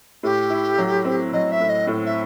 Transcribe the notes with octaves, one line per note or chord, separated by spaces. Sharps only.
A2 G4
E4
F#3
C4
F#3 D#5
E5
A2
D#5
A2
E5